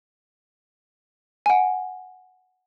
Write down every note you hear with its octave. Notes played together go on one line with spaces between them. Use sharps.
F#5 G#5